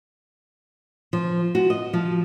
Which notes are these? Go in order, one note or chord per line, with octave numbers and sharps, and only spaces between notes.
F3
F#4
D#5
F3